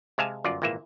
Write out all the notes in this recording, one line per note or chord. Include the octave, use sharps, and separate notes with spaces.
C3 G#3 E5 F5 G#5 A5
G1 F#2 F4 D5
G#1 A#2 E3 A#3 E5